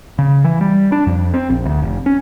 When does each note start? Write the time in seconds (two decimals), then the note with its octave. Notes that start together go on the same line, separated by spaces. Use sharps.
0.19 C#3
0.44 E3
0.61 G3
0.92 D4
1.07 F2
1.34 C4
1.49 A#1
1.65 D2
1.82 F1
2.06 C#4